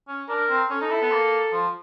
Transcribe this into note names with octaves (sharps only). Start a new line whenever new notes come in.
C#4
D4 A#4
C4
C#4 A4
D#4
E4
B3
A#3
F3